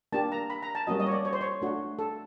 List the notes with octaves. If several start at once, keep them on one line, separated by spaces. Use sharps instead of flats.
A#3 D4 G4 A5
A#5
B5
A#5
A5
G3 A#3 C#4 F#4 D#5
D#5
C#5
D5
C#5
C5
C#5
A3 D4 F#4
A4